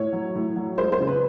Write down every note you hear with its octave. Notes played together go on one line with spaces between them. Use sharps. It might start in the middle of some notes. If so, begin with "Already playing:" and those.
Already playing: A2 C#5
F#3
A2
F#3
G#3 C5
C5
C#3
B4